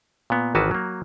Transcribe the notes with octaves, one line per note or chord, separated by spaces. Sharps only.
A#2 B3
G#1 D#3 E3 F#4 B4 A5
F#3 A#3